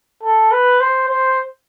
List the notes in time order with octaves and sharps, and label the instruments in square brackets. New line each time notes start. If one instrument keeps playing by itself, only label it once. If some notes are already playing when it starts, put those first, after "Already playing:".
[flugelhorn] A4
B4
C5
C5